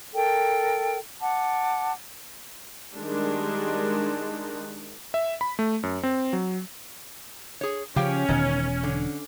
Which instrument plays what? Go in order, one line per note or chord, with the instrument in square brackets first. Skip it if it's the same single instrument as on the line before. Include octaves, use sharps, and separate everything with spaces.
[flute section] A4 A#4 G5
F#5 A5 D6
[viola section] D#3 G3 G#3 D4
[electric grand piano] E5
B5
A3
F#2
C4
F#3
[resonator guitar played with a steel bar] G#4 C#5
[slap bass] C#3 F3 [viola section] C#4 [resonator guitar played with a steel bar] G4 F5 G5
[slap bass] E1 B2 [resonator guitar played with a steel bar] D#3
[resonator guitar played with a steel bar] D3